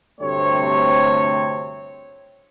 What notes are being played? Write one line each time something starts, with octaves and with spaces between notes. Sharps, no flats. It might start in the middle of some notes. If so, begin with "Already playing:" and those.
D2 G2 C3 A3 C4 C#5